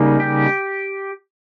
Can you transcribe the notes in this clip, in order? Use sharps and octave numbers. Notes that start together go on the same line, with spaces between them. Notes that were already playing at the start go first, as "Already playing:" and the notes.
Already playing: C#3 G3 A#3 D#4
G4